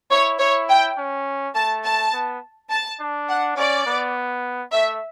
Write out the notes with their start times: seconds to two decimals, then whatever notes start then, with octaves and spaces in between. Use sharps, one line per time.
0.11 E4 C#5
0.39 E4 C#5
0.69 G5
0.97 C#4
1.55 A3 A5
1.84 A5
2.13 B3
2.70 A5
3.00 D4
3.29 F#5
3.57 C#4 D5
3.87 B3
4.72 A3 E5